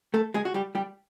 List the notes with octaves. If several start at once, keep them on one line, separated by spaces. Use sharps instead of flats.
A3 A4
G#3 G#4
F#4
G3 G4
G3 G4